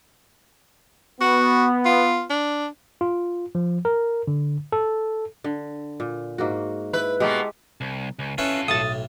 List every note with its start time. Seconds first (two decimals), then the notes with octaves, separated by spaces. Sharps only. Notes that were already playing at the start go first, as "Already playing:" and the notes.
1.21 B3 F#4
1.85 F4
2.30 D4
3.01 F4
3.55 F3
3.85 A#4
4.27 D3
4.72 A4
5.44 D3
6.00 A#2
6.38 G#2 A#3 F#4
6.93 E4 B4
7.20 B2 G#3 A#3 G4 A4
7.81 C2
8.19 C#2
8.38 C#4 E4 F4 A4 B4
8.68 B1 A2 D#6 A6